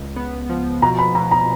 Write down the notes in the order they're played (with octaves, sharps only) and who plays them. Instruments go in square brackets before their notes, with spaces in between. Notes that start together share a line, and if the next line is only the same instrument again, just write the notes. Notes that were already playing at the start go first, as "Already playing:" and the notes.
Already playing: [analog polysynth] C#2
B3
F3
[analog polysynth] B2 [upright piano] A#5
[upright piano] B5
[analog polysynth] B2 [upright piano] A#5
[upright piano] A#5